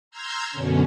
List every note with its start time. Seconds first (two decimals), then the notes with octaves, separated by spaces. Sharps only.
0.11 A#5 C6 E6 F6 G6 G#6
0.51 F#2 B2 D3 C#4